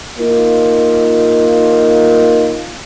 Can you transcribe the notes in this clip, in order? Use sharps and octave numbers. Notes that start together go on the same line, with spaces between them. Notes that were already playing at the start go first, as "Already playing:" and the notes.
A#3 D#4 F4